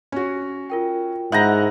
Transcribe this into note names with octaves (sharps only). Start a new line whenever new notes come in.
C#4 F#4
F4 A#4 G5
G#2 E4 D#5 F#5 A#5 G6